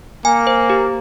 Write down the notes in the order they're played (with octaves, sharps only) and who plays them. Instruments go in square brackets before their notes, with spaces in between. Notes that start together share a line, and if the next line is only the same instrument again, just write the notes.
[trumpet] A#3 [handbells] G#5
[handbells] C5
G4